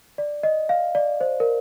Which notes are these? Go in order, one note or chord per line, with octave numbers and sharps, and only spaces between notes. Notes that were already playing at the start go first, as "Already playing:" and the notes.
D5
D#5
F5
D5
C5
A#4